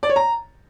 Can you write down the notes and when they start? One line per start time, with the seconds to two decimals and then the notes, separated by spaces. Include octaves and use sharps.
0.03 D5
0.09 C#5
0.16 A#5